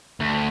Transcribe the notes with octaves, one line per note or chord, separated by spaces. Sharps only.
D2